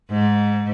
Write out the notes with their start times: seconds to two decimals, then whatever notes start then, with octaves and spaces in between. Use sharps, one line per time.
0.11 G#2